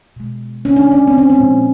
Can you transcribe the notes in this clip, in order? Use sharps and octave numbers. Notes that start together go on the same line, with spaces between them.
B2 G#3
C#4
D4
C#4
C4
C#4
C4
A#2 F3 G#3